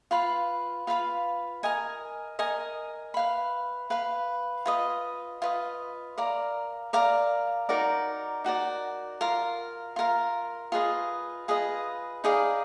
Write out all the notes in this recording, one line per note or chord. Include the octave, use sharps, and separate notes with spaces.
F4 B4 F5 B5
F4 B4 F5 B5
A#4 D#5 G#5
A#4 D#5 G#5
B4 F5 B5
B4 F5 B5
F4 B4 D#5
F4 B4 D#5
A#4 D5 F5 A#5
A#4 D5 F5 A#5
D#4 F#4 A#4 D5
D#4 F#4 A#4 D5
F4 A#4 F5
F4 A#4 F5
F4 G#4 B4 D#5
F4 G#4 B4 D#5
D#4 G#4 D5 F5